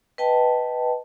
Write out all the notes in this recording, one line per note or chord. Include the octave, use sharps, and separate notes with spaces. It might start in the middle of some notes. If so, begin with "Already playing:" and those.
B4 D#5 G5 A5